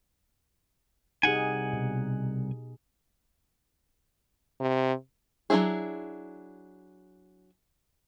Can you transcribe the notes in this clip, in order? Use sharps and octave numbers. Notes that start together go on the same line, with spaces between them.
C2 D#4 G4 G#4 F#5 G#5
B2
C3
F#3 A3 D4 E4 G#4